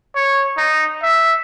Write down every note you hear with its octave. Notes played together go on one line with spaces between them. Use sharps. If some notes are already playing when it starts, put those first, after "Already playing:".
C#5
D#4
E5